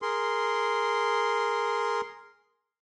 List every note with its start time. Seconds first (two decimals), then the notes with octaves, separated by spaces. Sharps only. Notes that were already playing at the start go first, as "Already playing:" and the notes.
0.02 G#4 A#4 C6